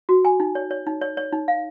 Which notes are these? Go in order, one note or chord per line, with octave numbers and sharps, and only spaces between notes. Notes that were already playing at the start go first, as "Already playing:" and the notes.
F#4
G#5
D#4
C#5
C#5
D#4
C#5
C#5
D#4
F5